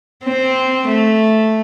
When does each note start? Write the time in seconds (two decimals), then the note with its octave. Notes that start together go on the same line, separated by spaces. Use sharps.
0.24 C4
0.88 A3